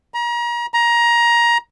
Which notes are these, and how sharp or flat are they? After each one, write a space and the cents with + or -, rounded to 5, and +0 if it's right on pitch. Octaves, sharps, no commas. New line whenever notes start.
A#5 +35
A#5 +20